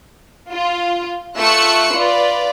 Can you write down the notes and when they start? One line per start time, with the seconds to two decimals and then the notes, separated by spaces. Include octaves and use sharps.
0.52 F4
1.38 A3 F4 C#6 E6 F#6 C#7
1.95 F4 B4 D5